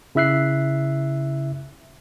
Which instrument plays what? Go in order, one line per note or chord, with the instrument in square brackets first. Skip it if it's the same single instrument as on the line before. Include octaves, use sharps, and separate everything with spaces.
[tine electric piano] C#3 E4 E5 F#6 C7